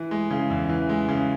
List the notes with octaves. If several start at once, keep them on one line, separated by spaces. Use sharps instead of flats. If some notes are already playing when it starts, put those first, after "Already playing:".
Already playing: E3
G#3
C#3
E2
E3
G#3
C#3